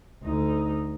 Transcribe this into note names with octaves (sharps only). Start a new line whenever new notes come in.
D2 D#4